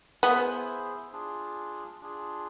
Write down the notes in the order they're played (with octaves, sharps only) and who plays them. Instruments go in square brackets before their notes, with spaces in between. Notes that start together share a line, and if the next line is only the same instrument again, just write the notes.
[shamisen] B3 [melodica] E4 G#4 C5
[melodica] D4 F4 G#4
D4 F4 G#4